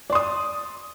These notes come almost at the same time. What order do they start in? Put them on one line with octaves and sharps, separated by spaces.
D5 C6 D#6